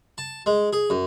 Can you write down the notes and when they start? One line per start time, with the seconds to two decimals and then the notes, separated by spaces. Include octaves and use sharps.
0.18 A5
0.46 G#3
0.73 G#4
0.90 F#2